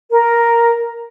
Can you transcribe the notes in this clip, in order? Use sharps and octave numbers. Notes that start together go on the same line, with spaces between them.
A#4